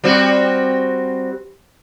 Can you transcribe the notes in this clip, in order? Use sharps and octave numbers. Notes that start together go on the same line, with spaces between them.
G3 C4 F#4